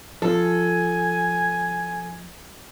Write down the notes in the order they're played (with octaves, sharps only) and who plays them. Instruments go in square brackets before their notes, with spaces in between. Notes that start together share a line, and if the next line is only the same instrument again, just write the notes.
[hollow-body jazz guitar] F3 [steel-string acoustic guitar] A4 [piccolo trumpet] G#5